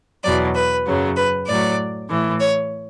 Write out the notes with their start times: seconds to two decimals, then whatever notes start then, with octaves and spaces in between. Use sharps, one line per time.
0.24 E2 B2 F#3 D5
0.56 B4
0.85 F#2 C#3 F#3
1.17 B4
1.48 A2 F#3 D5
2.09 A2 E3
2.40 C#5